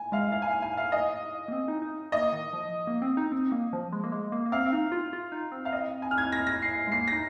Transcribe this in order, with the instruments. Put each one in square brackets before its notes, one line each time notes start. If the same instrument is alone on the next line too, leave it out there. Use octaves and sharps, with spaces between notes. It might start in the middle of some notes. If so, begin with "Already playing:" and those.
Already playing: [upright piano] G#5
[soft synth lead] G#3 [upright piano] F5
[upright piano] F5
G#5
F5
G#5
F5
D#5
[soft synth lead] A#3
C4
D#4
D#4
[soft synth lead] A#3 [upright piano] D#5
[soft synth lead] D#3
F3
A#3
C4
D#4
C4
A#3
F3
G#3
A#3
G#3
A#3
A#3
[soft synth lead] C4 [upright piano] F5
[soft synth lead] C4
D#4
F4
F4
D#4
C4
[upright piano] F5
D#5
G#5
F6
G#6
A#6
A#6
C7
[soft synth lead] G#3
[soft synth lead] A#3 [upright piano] C7
[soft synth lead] D#4 [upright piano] A#6